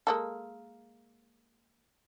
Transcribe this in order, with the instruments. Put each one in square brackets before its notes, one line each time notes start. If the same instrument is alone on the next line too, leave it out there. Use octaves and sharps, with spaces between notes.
[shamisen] G#3 A#3 A4